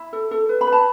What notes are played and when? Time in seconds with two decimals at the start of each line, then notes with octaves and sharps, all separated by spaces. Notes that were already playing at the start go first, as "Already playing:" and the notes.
Already playing: E4
0.13 A4
0.31 A4
0.49 B4
0.61 B5
0.67 B4
0.72 A5